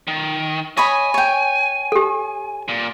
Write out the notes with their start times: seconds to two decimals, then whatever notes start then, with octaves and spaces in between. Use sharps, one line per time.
0.08 D#3
0.77 C#5 D#5 G#5 B5
1.14 C#5 G5
1.92 G4 A4
2.68 A#2